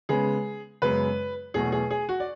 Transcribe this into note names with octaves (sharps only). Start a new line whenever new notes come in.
C#3 G#3 B3 G#4
F#2 C#3 G#3 B3 B4
E2 B2 F#3 A3 G#4
G#4
G#4
F#4
D5